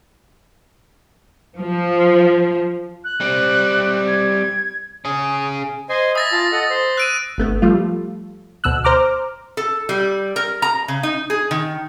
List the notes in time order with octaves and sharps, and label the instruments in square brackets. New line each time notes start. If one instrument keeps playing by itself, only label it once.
[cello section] F3
[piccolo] F#6
[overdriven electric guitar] G3 C4
[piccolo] G#6
[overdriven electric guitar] C#4 G#4 [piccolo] D#6
[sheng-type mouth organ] C5 D#5 G#5
[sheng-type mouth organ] E5 G#5 B5 [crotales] D#6 A6 A#6
[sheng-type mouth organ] F4 F5 A5
A4 D#5 F#5
C5
[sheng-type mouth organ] E6 [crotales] F#6 D7 D#7
[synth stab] G1 A3 B3
F3 G3 A3 F4
D2 B2 E6 F#6
C5 A#5 D6 F6
[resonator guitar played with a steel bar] A4
G3
A#4
A#5
C#3
D#4
G#4
D#3